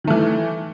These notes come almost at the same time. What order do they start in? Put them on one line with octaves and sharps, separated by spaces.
D#3 A3 E3